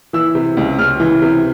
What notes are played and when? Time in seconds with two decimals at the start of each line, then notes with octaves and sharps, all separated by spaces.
0.13 E3 E6
0.35 C3
0.57 C#2
0.79 C#2 F6
1.00 E3
1.22 C3